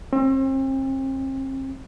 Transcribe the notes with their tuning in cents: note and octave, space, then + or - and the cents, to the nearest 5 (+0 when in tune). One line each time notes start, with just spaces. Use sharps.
C4 +40